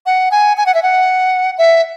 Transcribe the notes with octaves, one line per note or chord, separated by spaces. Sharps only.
F#5
G#5
G#5
F#5
E5
F#5
E5